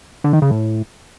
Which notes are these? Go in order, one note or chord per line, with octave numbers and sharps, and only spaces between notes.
D3
D#3
C#3
A2